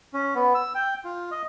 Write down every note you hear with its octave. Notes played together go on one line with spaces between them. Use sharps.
C#4
B3
E6
G5
F4
D#5